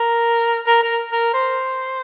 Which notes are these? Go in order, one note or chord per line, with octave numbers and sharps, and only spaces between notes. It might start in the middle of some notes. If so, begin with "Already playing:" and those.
Already playing: A#4
A#4
A#4
A#4
C5